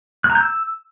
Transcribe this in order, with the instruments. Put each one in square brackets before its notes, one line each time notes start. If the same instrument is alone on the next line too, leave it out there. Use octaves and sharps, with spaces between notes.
[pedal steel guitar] F#6
A#5
G6
E6